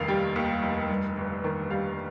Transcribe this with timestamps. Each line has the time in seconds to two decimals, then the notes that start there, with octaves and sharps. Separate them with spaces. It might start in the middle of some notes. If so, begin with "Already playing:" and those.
Already playing: F1 D#2 D#3 F5
0.08 G3 G5
0.36 D#2
0.63 F1
0.89 G2
1.17 G1
1.44 D#3
1.70 G3 F5